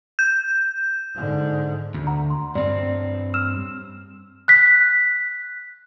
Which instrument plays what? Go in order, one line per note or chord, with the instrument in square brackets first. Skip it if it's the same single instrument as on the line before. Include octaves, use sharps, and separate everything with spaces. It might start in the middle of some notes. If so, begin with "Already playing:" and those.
[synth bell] G6
[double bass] G#2 D3
[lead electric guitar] D2
[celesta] F#5 A#5
C6
[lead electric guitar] G2 C4 [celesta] D5
[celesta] E6 F6 E7
F#6 B6